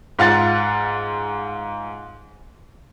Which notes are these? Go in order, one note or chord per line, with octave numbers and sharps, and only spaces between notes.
G#2 F4 F#5 A6